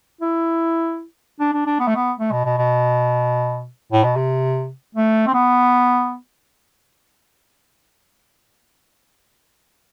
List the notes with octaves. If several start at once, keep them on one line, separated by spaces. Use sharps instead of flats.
E4
D4
D4
D4
B3
A3
B3
A3
B2
B2
B2
A2
B2
C3
A3
C4
B3